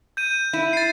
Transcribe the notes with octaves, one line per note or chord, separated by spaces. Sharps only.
G6 D#7
E4
A6 C7